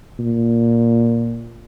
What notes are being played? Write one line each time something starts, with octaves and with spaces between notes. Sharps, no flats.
A#2